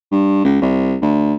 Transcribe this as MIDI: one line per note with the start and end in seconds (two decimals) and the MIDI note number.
0.12 0.42 43
0.45 0.62 37
0.62 0.96 36
1.02 1.34 38